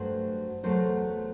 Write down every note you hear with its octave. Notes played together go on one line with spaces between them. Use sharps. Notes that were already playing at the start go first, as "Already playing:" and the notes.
Already playing: G2 F#3 A3 C5
E2 C3 F#3 A3 C5